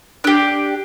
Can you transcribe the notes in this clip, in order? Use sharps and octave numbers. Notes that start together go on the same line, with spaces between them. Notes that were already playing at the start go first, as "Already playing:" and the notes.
D4 G4